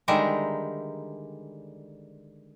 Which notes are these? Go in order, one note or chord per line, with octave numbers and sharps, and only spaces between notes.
D3 D#3 G3 G#3 E5 A#5